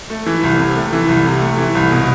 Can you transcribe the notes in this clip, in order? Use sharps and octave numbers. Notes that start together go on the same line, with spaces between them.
A3
E3
C2
C3
A3
E3
C2
C3
A3
E3
C2
B2